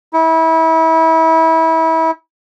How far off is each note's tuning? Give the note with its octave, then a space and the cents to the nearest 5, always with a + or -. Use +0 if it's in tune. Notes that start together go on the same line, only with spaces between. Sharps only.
E4 -30